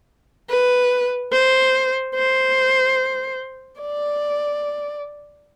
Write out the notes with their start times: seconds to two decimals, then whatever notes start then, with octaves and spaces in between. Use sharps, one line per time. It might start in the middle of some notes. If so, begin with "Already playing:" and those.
0.50 B4
1.32 C5
2.15 C5
3.81 D5